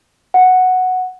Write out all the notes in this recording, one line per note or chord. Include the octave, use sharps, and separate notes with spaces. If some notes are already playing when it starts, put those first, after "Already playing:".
F#5